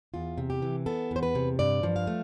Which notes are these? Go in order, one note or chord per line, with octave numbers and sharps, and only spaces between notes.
E2 F4
C3
G4
E3
B3 A4
E2 C5
B4
C3
G2 D5
F3
F5
A3